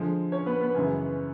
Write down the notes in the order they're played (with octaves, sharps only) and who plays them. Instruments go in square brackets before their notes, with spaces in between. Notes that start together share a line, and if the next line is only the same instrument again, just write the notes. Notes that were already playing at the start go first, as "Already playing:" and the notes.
Already playing: [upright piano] D3 F3 G#3
[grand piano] C#4 C#5
B3 B4
B3 B4
[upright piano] F#2 C#3 E3 G#3